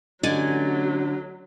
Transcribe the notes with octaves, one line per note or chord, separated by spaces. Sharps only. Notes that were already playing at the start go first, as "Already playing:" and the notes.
A1 D3 F#3 D5 D#5 G#5